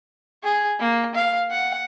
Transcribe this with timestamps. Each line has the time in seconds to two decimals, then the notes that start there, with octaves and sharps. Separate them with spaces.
0.44 G#4
0.79 A#3
1.15 F5
1.51 F#5